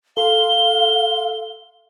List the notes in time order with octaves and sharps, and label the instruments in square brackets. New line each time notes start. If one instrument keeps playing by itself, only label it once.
[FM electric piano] A4 C6 [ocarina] F5 [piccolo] G7